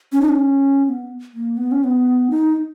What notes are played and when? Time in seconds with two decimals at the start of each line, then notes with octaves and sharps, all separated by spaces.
0.12 C#4
0.21 D#4
0.29 C#4
0.85 C#4
0.89 B3
1.34 A#3
1.57 B3
1.71 C#4
1.84 B3
2.30 D#4